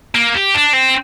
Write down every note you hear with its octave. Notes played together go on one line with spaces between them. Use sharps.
A#3
G4
D4
C4